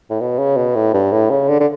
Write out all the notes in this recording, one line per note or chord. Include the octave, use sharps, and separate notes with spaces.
A2
B2
C#3
B2
A2
G2
A2
C#3
D3
D3